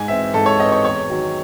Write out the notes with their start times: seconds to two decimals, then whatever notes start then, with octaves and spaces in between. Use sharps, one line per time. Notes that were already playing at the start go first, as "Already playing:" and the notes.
Already playing: G#2 G#5
0.08 E3 C4 E5
0.34 G#2 A4
0.46 C#5
0.60 E3 C4 D#5
0.72 C#5
0.85 E2 C#5
1.09 D#3 F#3